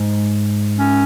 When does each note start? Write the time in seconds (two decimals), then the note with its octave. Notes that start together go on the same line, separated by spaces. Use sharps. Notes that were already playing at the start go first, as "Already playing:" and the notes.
Already playing: G#2
0.79 C#4